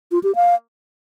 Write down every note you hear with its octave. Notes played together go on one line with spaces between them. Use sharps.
F4
G4
F5